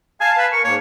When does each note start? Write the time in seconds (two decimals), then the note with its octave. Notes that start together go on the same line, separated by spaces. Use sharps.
0.21 F5 G#5 A5
0.38 B4
0.53 A#4 C#6
0.64 G#2 A#3 C#5